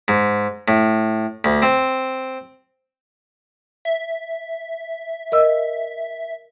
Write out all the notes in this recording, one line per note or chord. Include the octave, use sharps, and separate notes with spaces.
G#2
A2
D2
C4
E5
A#4 D#5 E6